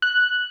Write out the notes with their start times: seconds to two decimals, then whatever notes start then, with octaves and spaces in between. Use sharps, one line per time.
0.02 F#6